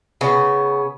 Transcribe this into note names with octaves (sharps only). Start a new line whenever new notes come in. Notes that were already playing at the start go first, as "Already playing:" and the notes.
C#3 B3